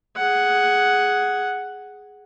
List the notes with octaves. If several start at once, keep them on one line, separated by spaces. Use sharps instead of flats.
G#4 F#5